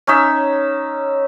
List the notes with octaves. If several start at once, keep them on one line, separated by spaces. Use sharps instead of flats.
C#4 D#4 C#5 E5